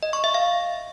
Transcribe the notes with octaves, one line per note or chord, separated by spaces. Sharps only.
D#5
C#6
E5
F5